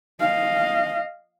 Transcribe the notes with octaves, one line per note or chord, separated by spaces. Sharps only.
D#5 F5